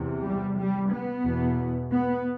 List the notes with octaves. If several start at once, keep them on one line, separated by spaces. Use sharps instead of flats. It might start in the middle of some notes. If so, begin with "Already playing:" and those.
Already playing: E2 C3
G3
G3
B3
E2 B2
B3